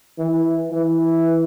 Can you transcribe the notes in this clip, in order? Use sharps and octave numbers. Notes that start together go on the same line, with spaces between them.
E3
E3